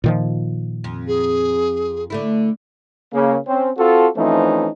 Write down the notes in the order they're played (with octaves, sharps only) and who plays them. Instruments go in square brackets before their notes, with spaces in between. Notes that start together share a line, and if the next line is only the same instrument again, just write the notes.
[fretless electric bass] A#2 D#3 F3
[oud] F2
[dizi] G#4
[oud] D3 A3 E4
[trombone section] C#3 A#3
C4 C#4
C4 F4 F#4 A4
E3 F3 A3 C4 C#4 D#4